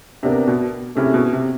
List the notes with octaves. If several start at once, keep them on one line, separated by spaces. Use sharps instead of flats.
C3 B3 D4 G4 A#4
B2
C3 A3 C#4 E4 G#4
B2
C3